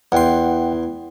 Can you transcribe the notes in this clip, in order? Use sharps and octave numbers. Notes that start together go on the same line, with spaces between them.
E2 F#5 G5 C6